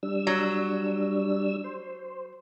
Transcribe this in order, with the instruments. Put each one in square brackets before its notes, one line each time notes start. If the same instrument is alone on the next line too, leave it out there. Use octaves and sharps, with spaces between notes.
[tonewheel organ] G3 D4 E6
[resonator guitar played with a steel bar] F#3
[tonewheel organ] C5